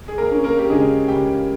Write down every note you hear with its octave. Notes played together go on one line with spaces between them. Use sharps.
G#4
A#3 A#4
C#4
A#3 A#4
G4
C#3 G#3 G#4
C#2 G4 G5